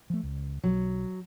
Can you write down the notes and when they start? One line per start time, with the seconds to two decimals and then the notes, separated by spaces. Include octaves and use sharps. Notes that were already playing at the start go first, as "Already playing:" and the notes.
0.10 F3 A3
0.23 C#2
0.64 B1 F#3